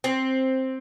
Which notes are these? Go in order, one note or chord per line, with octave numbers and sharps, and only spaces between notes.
C4